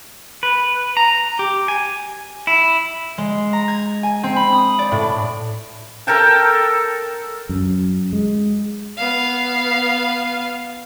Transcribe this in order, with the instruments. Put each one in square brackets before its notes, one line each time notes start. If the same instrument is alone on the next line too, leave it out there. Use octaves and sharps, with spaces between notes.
[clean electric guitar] B4
A#5
G4
G#5
E4
[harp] G#3
A#5
G#6
G#5
C4
B5
D#6
D5
A2
[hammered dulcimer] A4 A#4 G5 A5
[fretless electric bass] F#2
G#3
[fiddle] B3 F5